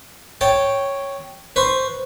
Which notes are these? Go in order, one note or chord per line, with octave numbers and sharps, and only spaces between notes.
C#5 G5 A5
B4 C5 C#6